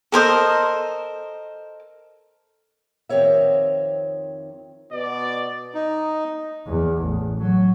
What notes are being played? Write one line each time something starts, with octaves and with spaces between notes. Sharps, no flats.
A4 A#4 C5 D#5
F2 D#3 C4 G4 C#5 E5
B2 D5
D#4
E2
A1
F#3